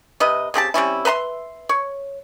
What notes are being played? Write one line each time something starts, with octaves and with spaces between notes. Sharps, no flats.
C3 B4 D#5
C#3 C4 G4 A5
G3 C4 C#4 E4
B4 E5 A#5 C6
C#5